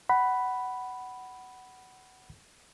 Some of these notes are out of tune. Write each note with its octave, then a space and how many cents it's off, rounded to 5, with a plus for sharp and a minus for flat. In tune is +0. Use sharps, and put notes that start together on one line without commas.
F#5 +15 B5 +0